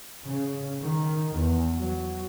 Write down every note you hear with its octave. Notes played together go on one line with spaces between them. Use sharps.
C#3
D#3
E2
F#3